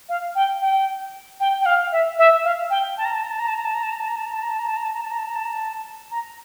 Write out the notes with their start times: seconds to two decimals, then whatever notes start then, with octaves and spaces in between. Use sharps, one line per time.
0.09 F5
0.35 G5
0.61 G5
1.40 G5
1.61 G5
1.66 F5
1.92 E5
2.19 E5
2.44 F5
2.70 G5
2.98 A5
3.05 A#5
3.14 A5
3.23 A#5
3.31 A5
3.40 A#5
3.48 A5
3.57 A#5
3.65 A5
3.74 A#5
3.83 A5
3.91 A#5
4.00 A5
4.08 A#5
4.16 A5
4.26 A#5
4.33 A5
4.42 A#5
4.50 A5
4.59 A#5
4.68 A5
4.77 A#5
4.84 A5
4.93 A#5
5.01 A5
5.10 A#5
5.18 A5
5.27 A#5
5.35 A5
5.45 A#5
5.53 A5
6.11 A#5